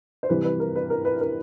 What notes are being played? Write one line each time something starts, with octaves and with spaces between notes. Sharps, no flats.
C5
C3 E3 G3 B4
B4
A#4
B4
A#4
B4
A#4